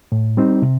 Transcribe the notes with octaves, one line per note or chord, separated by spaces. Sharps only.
A2
G3 C4 D#4
C3